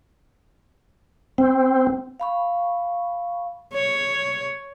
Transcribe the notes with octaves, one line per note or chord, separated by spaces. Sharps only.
C4
F5 B5 C#6
C#5